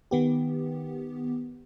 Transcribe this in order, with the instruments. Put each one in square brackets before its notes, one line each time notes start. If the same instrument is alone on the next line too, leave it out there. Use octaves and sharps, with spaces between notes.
[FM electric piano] D#3 B3 G4